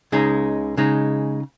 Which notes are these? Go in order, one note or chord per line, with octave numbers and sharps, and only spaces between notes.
C#2 C#3 G#3 D#4
C#3 G#3 D#4